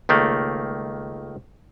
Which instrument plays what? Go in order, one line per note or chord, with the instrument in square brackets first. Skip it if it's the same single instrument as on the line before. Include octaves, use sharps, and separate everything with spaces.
[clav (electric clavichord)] C#2 D#3 A3 A#3